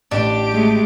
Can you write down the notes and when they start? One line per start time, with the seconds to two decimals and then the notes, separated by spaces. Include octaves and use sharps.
0.11 A1 D4 G4 D7
0.52 G#3 A3